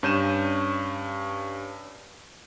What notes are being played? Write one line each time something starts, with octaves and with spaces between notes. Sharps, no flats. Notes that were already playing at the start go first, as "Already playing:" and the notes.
G2 C#4 G6 D#7 E7